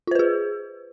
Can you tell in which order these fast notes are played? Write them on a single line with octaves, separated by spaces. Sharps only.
F4 C5 B4 G#4